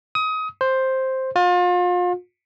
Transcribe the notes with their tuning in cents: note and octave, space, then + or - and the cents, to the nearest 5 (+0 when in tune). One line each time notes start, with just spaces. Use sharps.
D#6 +25
C5 +5
F4 +35